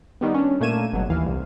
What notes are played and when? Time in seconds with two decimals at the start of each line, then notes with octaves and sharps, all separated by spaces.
0.21 D#3 G3 B3
0.34 C#4 D4
0.60 A#2 A3 A#3 G#6 D#7 E7
0.93 G1 B2 F#3
1.09 D#2 E3 F5
1.26 C2